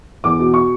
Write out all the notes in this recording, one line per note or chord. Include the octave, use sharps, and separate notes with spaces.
E2 D6
B2
C#6